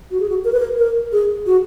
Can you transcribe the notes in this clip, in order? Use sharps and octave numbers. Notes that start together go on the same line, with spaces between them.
F#4
G#4
F#4
A#4
B4
A#4
A#4
G#4
F#4